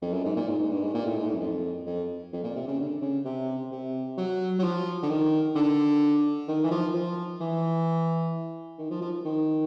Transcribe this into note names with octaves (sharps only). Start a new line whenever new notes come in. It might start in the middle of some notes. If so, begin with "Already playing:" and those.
F2
F#2
G#2
A#2
G#2
G#2
G2
G#2
A#2
A2
G#2
A2
F#2
F2
F2
F2
A#2
C3
C#3
D3
C#3
C3
C3
F#3
F#3
F3
D3
D#3
D3
D#3
E3
F3
F3
E3
D#3
F3
F3
D#3